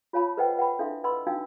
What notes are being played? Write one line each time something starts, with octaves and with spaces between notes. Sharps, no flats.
F4 C#5 F5 A5 B5
A4 B4 C5 D#5 F#5 G5
B4 F#5 G5 B5
D4 E4 A4 E5 F5 C6
B4 D#5 F#5 B5 C6 E6
D4 D#4 F#4 F5 G5 E6